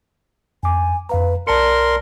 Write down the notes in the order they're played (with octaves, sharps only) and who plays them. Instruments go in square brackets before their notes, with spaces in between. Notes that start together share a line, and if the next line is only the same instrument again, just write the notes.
[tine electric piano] F2 D6 [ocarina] G#5
[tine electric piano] F2 F5 A#5 [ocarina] B4
[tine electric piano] B1 A5 C#7 [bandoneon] A#4 C6 [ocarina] D5